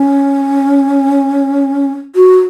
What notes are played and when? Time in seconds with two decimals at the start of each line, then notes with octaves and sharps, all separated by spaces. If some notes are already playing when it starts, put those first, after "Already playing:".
Already playing: C#4
2.15 F#4